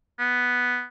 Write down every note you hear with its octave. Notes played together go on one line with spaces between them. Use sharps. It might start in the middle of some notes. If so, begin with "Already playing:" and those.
B3